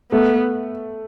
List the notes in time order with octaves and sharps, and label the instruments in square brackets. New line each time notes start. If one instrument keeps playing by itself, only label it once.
[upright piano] A3 [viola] B3